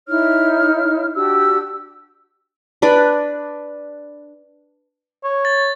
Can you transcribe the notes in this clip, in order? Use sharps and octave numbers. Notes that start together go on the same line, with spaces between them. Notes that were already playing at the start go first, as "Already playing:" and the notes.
D#4 E4 C#5 F6
D4 F#4 G4 E6
D4 B4 D5 B5
C#5
A6